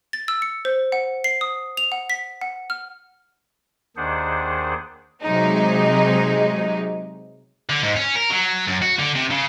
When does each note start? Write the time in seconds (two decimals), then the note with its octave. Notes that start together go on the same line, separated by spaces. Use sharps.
0.13 A6
0.28 E6
0.42 C#7
0.65 C5
0.92 F#5
1.24 C7
1.41 D#6
1.77 F7
1.92 F#5
2.10 B6
2.41 F#5
2.70 F6
3.97 D#2 D#3 D4 G#4 C5 F#5
5.22 C3 F#3 G#3 D#4
7.70 D3
7.83 G#2
7.96 C#4
8.15 A#4
8.30 F#3
8.68 F#2
8.82 F#4
8.99 D3
9.15 C3
9.31 C#3